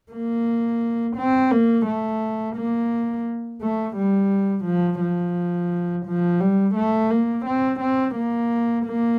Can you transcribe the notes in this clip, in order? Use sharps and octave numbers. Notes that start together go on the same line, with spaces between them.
A#3
C4
A#3
A3
A#3
A3
G3
F3
F3
F3
G3
A3
A#3
C4
C4
A#3
A#3